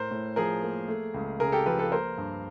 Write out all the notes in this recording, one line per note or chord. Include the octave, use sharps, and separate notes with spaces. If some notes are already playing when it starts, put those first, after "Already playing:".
Already playing: A2 A#4 C5
A2
F3 G#4 A#4
A#3
A3
C#2
C#3 G#4 A#4
G4 A4
F3 A4 B4
A4 B4
A#3 A#4 C5
G2